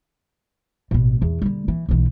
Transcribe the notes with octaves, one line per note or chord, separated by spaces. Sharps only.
A1 B2
E2
D3 G3
E3
B1 E3